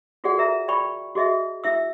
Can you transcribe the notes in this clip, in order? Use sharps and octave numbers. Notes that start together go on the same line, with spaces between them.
F4 F#4 G#4 D5 F#5
A#4 E5 A#5
D5 G5 B5 C#6
F#4 G#4 D#5 E5
E4 E5 E6